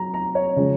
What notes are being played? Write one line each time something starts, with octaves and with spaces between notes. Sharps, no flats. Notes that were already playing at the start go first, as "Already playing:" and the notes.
Already playing: F#3 A#5
A#5
C#5
C#3 F3 G#3 C#4